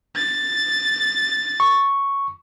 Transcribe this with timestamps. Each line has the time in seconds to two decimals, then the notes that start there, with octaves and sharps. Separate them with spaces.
0.16 A6
1.60 C#6